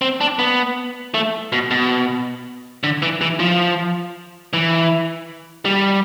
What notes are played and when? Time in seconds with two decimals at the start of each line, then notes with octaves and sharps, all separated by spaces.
0.01 C4
0.21 D4
0.39 B3
1.14 A3
1.52 B2
1.71 B2
2.83 D3
3.02 E3
3.21 E3
3.40 F3
4.53 E3
5.65 G3